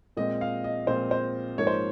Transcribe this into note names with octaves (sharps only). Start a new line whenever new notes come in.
A#2 G#3 C4 D#5
F5
D#5
A#2 G#3 C4 C5
C5
G#2 F3 A#3 C#5
C5